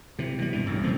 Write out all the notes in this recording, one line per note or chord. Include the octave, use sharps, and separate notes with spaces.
C3 E3
B2 G3
G2 E3
B1 F#2 A2
C#3 A3 C4